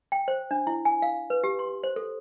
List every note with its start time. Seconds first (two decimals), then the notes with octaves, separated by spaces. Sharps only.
0.12 G5
0.28 C5
0.51 D4
0.67 E4
0.85 G#5
1.02 F5
1.30 B4
1.44 G4
1.59 C6
1.83 C5
1.96 A4